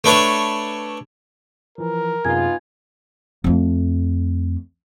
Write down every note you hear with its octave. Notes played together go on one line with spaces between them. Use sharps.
A3 D4 B4 C#5
E3 F3 A#4
F#2 C3 B3 D#4 F4 G#4 G#5 G#6
F2 A3